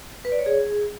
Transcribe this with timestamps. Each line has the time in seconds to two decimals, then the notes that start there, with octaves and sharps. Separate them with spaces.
0.25 B4
0.32 D5
0.39 C#5
0.46 G#4